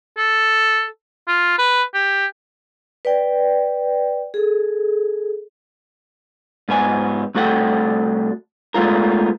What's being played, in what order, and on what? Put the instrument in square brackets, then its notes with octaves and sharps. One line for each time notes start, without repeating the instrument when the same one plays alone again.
[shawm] A4
F4
B4
G4
[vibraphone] B4 D5 G5
G#4 A4
[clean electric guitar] G#2 B3 G#5
C2 A3 F#4 A4 F#5 G5
G#3 A3 B3 F4 A#4